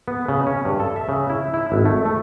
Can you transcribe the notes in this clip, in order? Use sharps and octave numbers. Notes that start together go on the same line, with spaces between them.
B3
C#3
C#4
G2
A4
E5
C#3
E4
E4
G#1
A3
A3